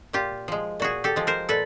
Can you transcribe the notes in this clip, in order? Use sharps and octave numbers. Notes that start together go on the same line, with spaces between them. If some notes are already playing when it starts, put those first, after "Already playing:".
A#2 F4 G4
F3 G#3
A#2 F#4 G#4
G4 A4
F3 G#3
A#4 C5
A#2 A4 B4